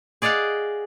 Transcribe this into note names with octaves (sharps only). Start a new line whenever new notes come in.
G#4 D5 D#5 F5 F#5